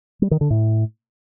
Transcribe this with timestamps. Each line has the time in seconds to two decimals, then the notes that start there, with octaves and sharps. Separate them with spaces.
0.22 G3
0.31 D#3
0.41 D3
0.50 A2